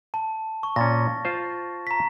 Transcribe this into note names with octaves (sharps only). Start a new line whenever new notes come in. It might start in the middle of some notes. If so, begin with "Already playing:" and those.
A5
C#6
A#2 C#4 A6 A#6
F4 C5
A#5 B6